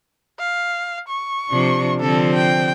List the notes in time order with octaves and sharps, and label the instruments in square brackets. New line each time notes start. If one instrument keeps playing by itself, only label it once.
[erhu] F5
C#6
[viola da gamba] C3 F3 D4
[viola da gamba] D3 F3 C4 [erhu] A4
[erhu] G5